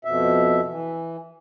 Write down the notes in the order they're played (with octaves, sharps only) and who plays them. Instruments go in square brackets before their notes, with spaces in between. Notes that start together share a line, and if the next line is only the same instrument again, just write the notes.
[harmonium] F2 B2 E5
E3